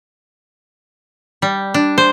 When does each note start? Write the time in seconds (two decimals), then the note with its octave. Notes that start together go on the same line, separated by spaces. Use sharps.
1.42 G3
1.74 D4
1.98 C5